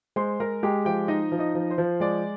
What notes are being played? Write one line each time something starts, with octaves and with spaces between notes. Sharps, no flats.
G#3 C5 C6
G#3 A#4 A#5
G#3 G4 G5
F3 G4 G5
D#4 D#5
F3
D#4 D#5
F3
C5
F3
G#3 D5